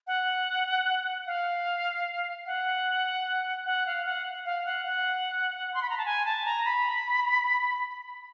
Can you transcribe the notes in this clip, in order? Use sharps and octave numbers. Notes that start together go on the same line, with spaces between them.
F#5
F5
F#5
F#5
F5
F#5
F5
F#5
F#5
C6
B5
A#5
A5
G#5
A5
A#5
B5